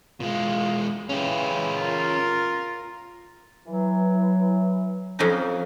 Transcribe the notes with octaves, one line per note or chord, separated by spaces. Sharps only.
B2 G#3 F4
C#3 E3 C#4 G4
F4 A#4
E3 F#3
F2 C#4 D#4